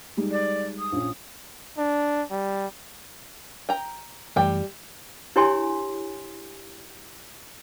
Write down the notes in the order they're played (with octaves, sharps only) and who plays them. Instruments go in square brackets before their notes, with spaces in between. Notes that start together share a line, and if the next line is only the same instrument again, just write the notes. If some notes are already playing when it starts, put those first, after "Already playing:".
[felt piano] G3 G#3 D#4
[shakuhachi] D5
D#6
[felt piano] A#1 C#4
[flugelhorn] D4
G3
[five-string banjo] G5 A#5
[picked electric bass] F#2 E3 A3 [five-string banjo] G3 G5
[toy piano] D4 E4 G4 C#5 G#5 C6